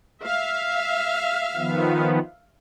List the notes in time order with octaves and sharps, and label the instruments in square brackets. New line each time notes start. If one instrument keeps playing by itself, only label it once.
[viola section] E5 F5
[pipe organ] D#3 F3 B3